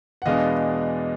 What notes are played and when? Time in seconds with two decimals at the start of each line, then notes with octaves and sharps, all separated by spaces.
0.22 F#5
0.25 E2 B2 G#3 B3 D4 D#5 F5